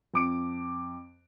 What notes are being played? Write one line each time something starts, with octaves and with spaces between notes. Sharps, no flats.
F2 D6 D7